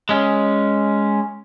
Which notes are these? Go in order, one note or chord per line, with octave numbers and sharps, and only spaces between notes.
G#3 C#4